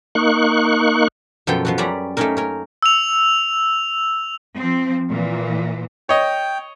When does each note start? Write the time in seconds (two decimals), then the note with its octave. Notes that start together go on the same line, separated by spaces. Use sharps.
0.15 A#3 D#4 C#6 F#6
1.47 F#2 B2 F3 B3 A4 G5
1.65 F3 B3 F#4
1.78 F#2 G3 C#4 D5 A#5 B5
2.17 A3 A#3 C4 C#4 D#4 A#4
2.37 C#4 A#4
2.83 E6 F7
4.57 F3 C4
5.10 A#2 E3
6.09 C#5 D#5 G5